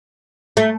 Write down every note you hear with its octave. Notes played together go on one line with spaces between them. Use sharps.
A3